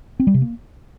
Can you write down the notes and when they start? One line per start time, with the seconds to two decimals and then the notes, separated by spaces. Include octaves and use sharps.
0.20 C4
0.27 G3
0.34 C3
0.42 A#3